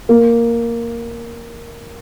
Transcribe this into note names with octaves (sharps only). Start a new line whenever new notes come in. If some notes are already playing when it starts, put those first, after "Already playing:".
A#3